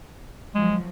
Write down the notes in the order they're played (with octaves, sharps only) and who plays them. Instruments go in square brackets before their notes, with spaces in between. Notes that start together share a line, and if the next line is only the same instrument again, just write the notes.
[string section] F3 F#3 [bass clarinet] G#3